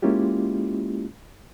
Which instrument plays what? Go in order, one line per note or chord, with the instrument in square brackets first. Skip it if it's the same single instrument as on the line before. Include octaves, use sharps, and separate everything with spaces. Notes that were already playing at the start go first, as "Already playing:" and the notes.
[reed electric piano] G#3 A#3 C#4 E4 F4 G4